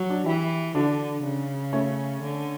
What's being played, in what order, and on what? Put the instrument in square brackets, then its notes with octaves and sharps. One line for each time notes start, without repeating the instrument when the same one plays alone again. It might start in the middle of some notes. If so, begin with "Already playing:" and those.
Already playing: [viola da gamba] F#3
[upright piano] D4 F#4
[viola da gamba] E3 [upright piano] E4 G4
[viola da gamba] D3 [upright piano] D4 F#4
[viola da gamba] C#3
[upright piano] A3 C#4
[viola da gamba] D3